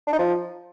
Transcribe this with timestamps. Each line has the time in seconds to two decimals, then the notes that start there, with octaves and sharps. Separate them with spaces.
0.07 D4
0.13 D#4
0.19 F3